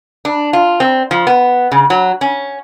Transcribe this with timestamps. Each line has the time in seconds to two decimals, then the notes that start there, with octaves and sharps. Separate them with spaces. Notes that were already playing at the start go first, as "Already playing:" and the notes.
0.25 D4
0.53 F4
0.80 C4
1.11 F3
1.27 B3
1.72 C#3
1.90 F#3
2.21 C#4